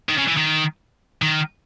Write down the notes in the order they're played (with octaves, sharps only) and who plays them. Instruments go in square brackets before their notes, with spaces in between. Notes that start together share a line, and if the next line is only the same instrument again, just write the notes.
[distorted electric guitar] D#3
C#3
E3
D#3
D#3